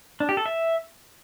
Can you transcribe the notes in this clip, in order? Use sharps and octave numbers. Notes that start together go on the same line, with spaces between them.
D4
G4
A4
E5